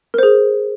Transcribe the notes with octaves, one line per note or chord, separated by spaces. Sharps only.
G#4 A#4 C5